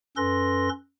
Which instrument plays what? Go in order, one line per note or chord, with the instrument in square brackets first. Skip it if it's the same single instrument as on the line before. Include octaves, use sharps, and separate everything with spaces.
[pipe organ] F#2 C#4 A4 B4 C6 A#6